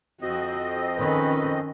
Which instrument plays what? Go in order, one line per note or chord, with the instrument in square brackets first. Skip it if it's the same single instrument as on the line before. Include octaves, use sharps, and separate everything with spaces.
[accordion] F2 C4 D#5 [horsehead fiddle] F#4
[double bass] D#3 C#4 [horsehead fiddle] B4